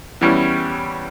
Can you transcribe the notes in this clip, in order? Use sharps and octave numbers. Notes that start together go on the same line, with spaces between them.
E2 E3 G3 C#4